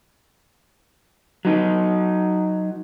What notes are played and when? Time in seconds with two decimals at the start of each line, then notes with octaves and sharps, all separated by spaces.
1.45 F#3 D#4